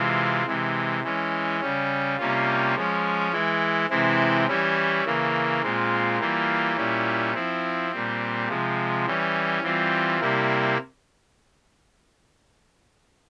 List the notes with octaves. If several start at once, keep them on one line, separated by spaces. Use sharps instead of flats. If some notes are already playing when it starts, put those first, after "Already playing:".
Already playing: C3 E3 G#3 C4 F4
C3 E3 G#3
E3 G#3 C#4
C#3 G3 C#4
C3 G3 A#3 C#4 F4
F3 G#3 C#4
E3 G#3 E4
C3 E3 G#3 C4 E4
E3 G3 C#4 E4
C#3 E3 A#3
A#2 G#3 C4 F4
E3 G3 A#3 F4
A#2 G3 C#4 E4
F3 C4 E4
A#2 G3 C4
C3 F3 G#3
E3 G3 C#4
E3 G3 C4 F4
C3 G3 A#3 E4